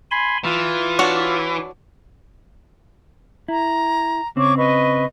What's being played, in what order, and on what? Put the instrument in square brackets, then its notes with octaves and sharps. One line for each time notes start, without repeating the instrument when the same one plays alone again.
[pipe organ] G#5 B5 C6
[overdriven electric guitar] E3 [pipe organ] F4
[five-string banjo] D4 F#4 C#5
[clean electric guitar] E4 [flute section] A#5
[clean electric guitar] C#3 C4 [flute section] C#5 C#6 D6
[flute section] B4 D#5 C#6